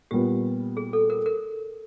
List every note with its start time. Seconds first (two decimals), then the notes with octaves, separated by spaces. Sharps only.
0.11 A#2 G3 B3 G4
0.77 G#4
0.93 A4
1.10 A#4
1.26 A#4